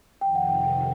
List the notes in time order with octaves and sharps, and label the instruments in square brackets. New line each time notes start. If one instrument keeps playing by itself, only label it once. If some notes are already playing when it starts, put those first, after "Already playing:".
[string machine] F2 C3 D#3 [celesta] G5
[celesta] F#5
G5
G5